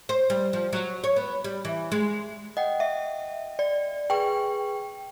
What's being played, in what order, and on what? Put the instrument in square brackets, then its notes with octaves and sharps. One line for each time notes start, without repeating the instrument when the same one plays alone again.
[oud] C5
G3
F3
F#3
C#5
B3
G3
E3
G#3
[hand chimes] D#5 F#5 G5
[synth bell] E5
D5
[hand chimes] G#4 B4 C#6 [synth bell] G5